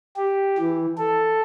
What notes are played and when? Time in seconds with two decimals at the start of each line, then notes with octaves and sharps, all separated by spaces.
0.16 G4
0.58 E3
0.98 A4